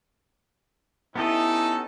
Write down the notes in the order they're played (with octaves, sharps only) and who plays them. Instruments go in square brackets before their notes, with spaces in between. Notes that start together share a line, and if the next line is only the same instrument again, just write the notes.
[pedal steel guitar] B3 G4 D#5 [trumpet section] C#4 D#4 A4 [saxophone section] E4